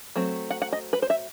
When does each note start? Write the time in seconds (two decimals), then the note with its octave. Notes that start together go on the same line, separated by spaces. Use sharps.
0.16 F#3 A3 C4
0.50 F#5
0.62 F#5
0.73 D#5
0.93 B4
1.02 C5
1.10 E5